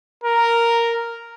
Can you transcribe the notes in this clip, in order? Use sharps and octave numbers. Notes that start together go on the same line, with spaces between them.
A#4